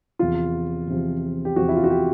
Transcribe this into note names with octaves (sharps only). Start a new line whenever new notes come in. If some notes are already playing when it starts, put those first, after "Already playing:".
E2 C3 F3 F4
E2 C3 F3
G4
E2 C3 F3 F#4
E4
F4
F#4
G4